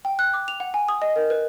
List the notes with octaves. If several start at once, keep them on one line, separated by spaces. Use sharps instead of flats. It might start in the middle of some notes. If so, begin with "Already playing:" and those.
G5
F#6
D6
F7
F#5
G#5
D#6
D#5
A#4
B4